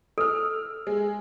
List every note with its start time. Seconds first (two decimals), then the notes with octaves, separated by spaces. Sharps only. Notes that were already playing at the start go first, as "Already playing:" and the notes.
0.18 A4 E6 F6
0.87 G#3